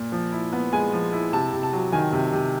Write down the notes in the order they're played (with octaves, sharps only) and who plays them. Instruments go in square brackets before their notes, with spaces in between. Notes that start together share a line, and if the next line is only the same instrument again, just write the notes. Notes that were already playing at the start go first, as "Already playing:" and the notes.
Already playing: [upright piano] A#2
F3
E4
B3
G#3 G#5
F3
E4
C3 A5
C3
A5
F#3
D#3 G#5
C3
C3